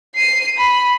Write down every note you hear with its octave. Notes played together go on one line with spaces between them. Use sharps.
C7 D#7
B5